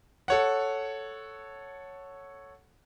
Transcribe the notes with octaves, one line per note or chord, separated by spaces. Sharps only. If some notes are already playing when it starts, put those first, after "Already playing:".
A4 C#5 F#5